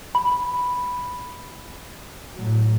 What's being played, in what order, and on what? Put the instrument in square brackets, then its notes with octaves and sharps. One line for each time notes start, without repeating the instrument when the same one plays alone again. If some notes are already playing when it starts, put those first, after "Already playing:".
[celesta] B5
[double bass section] A2 F#3